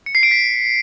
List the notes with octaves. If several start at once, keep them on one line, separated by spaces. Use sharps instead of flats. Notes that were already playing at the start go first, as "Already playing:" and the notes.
C#7
C7
D7
B6